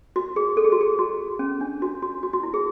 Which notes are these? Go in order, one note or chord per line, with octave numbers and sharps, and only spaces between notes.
F#4
G#4
A4
G#4
F#4
G#4
F#4
C#4
D4
F#4
F#4
F#4
F#4
E4
G#4